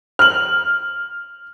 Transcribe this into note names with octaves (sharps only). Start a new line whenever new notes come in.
F6 F#7